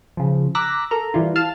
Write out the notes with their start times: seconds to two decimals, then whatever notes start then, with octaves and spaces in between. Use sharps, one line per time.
0.17 C#3 F3
0.55 A#5 D6 E6 F#6 A#6 B6
0.91 A4 A#4 A#5
1.14 E3 G3 E4 F4
1.36 F5 A5 F6